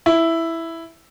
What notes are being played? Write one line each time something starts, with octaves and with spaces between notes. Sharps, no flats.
E4